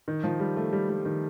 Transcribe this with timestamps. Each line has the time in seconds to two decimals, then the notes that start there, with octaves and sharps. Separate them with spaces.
0.08 D#3
0.24 F3
0.40 G3
0.56 A3
0.73 G3
0.90 G3
1.05 D#3